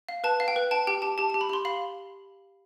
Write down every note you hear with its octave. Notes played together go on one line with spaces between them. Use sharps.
F5
B4 A5
F5
G5
B4
G5 A5
G4 G5
G4 A5
G4 A5
A5
G4
B5
G4 C6
F5 B5